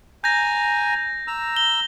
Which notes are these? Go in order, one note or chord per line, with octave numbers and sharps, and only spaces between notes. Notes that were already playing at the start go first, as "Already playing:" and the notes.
G#5 A#5 G6 A#6
A#5 E6
G7